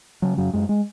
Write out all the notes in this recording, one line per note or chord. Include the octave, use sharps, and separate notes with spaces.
C#3 F#3
F#2 F#3
F#2 G#3
G#3